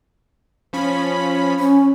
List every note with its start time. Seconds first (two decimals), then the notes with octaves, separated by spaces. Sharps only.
0.73 F3 C#4 B5
1.59 C#4